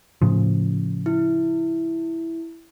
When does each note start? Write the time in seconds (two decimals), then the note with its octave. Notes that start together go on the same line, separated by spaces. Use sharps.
0.22 A2 C#3 F3
1.06 E4